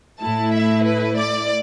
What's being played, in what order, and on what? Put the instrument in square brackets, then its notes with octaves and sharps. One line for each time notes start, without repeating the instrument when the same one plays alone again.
[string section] A2 A3 E4 A5
E5
B4
D5